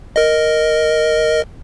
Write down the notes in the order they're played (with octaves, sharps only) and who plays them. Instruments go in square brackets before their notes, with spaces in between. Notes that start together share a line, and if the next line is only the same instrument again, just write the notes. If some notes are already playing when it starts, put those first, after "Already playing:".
[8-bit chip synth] A#4 D#5